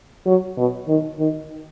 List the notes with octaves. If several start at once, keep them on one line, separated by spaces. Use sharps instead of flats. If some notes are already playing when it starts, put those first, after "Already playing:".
F#3
B2
D#3
D#3